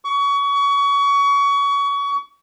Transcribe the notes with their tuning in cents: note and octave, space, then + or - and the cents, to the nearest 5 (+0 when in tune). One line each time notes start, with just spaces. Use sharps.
C#6 +30